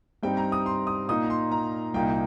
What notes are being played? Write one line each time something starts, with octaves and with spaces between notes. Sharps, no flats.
G2 G3 C4 D#4 G5
A#5
D#6
C6
D#6
A#2 A#3 D#4 D#6
A#5
C6
A#5
C2 A#2 A#3 D#4 G5